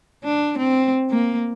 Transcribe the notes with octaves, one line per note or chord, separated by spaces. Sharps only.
D4
C4
A#3